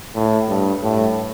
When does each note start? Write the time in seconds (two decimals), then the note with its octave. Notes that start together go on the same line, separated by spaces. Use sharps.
0.15 A2
0.49 G2
0.83 A2